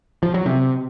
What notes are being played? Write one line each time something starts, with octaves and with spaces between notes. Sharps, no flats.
F3
F#3
C3